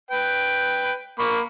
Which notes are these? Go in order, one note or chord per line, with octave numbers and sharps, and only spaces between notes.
B4 G5
A#3 B5 C#6